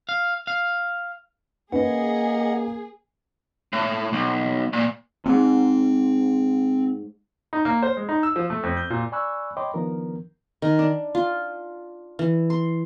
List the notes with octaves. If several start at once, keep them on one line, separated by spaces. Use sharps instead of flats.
F5
F5
A#3 C#4 G#4 B4 D#5 F#5
A2
B1
A#2
D2 G#2 C4
D#4
A#3
C5
G#3
D#4
E6
F3
A3
F2
G6
A#2
D5 G#5 B5 C#6 E6 F#6
C#5 D#5 G5 B5 C6 D6
D#3 F3 B3 D4 A#4
D#3
D4
F4
E3
C6